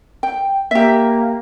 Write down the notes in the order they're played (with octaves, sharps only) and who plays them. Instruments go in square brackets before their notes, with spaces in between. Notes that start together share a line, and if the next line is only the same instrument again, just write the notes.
[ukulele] G5
[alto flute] A#3 [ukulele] G4 E5